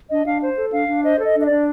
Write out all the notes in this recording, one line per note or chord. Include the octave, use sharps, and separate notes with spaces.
D4 D#5
D4 F5
C5
A4
D4 F5
D4
C5 D#5
A4
D#5
D4
D#5
D4 D5